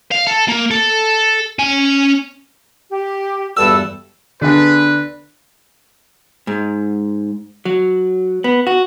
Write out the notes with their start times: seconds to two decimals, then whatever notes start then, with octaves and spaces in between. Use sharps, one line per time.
0.12 F5
0.27 A4
0.48 A#3
0.71 A4
1.59 C#4 G#5
2.90 G4
3.57 E2 G2 F#4 A4 B4 D5 E6
4.41 D3 B3 D4 G#4 B4
6.47 G#2
7.65 F#3
8.44 B3
8.67 F#4